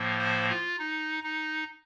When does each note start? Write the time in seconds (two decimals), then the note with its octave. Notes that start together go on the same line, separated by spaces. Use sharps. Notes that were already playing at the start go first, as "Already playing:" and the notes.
Already playing: A2 F3 A#3
0.19 C5
0.49 F4
0.79 D#4
1.23 D#4